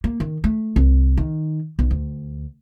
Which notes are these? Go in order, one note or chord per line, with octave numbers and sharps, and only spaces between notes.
A#3
D#3
A3
C2
D#3
B1
D2